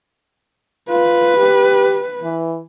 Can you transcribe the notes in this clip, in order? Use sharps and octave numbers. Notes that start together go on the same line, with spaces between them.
F4 B4
G4
E3